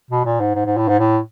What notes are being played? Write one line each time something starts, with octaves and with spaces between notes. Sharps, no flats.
B2
A#2
G#2
G#2
G#2
A2
G#2
A2